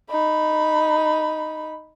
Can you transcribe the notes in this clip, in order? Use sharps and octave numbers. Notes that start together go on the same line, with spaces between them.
D#4 B5